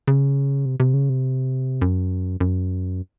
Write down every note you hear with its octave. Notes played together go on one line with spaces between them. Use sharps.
C#3
C3
C3
C#3
C3
F#2
F#2